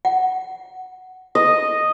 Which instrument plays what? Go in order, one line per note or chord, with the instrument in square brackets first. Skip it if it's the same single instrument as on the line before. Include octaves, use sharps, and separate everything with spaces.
[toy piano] F#5
[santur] D#5